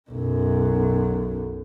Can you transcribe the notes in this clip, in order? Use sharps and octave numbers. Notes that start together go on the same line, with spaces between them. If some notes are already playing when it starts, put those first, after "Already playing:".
B1 F#2